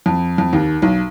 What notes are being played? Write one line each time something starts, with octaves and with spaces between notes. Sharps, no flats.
F2
F2
D#2
B1